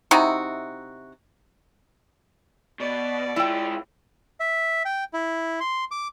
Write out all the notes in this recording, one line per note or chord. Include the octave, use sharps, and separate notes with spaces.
C3 D#4 E4 F#4
B2 D5
G#3 E4 F4 G5
E5
G5
E4
C6
D6